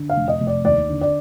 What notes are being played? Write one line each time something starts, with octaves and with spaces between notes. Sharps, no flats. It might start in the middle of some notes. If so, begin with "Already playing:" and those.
Already playing: D3
F5
F1
D#5
F1
D5
D#2 D5
D3
D5